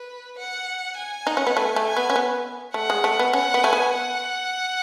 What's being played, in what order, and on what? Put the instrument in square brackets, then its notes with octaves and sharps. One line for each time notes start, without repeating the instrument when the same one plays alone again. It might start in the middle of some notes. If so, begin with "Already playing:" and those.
Already playing: [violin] B4
F#5
G#5
[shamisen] D#4 [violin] F#5
[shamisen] C#4
B3
[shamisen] A3 [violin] G#5
[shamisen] A3
[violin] G#5
[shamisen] B3
C#4
B3
[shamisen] A3 [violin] F#5
[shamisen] G#3
A3
B3
[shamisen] C#4 [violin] F#5
[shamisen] B3
[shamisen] A3 [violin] G#5
[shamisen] B3
[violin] F#5